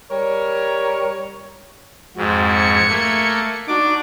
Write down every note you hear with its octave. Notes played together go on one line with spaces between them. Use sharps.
G3 A#4 C#5
F2 G#2 F#4
G#6 C#7
A3 A#3
D4 D#4 F#4 D6